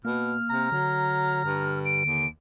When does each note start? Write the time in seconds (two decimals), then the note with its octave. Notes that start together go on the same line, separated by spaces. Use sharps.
0.05 B2 A#3 F6
0.50 C3 A#5
0.72 D3 F#3
1.45 G2
1.85 D7
2.05 D#2